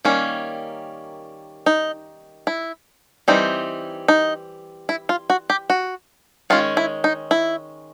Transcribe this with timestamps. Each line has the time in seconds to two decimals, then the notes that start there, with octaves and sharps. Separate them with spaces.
0.05 D#3 G3 A#3 C#4
1.66 D#4
2.47 E4
3.28 E3 G3 C4 D#4
4.08 D#4
4.89 E4
5.09 F4
5.30 F#4
5.50 G4
5.70 F#4
6.50 D#3 G#3 C#4 F4
6.77 E4
7.04 D#4
7.31 E4